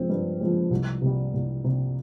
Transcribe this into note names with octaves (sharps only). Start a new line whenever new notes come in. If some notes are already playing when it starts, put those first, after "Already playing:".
Already playing: F3 G#3 C4
G2
F3 G#3 C4
C2
C3 G3
C2
C3 G3